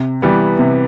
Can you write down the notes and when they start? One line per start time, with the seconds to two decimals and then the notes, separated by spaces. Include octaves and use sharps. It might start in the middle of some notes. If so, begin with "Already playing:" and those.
Already playing: C3
0.22 E3 G3 B3
0.59 C3